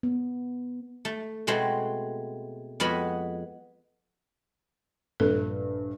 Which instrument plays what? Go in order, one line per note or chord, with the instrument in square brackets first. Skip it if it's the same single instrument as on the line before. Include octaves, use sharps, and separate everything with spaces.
[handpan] B3
[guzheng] A3
B2 G#3 A3 C4 F#4
F2 G#3 B3 F#4 D#5 B5
[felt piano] A#1 G2 [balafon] A4